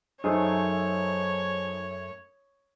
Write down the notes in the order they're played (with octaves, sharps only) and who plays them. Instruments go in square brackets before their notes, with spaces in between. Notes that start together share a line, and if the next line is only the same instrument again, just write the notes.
[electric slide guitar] F#2 A3 [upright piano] D#4 G#4 C5 [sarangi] C#5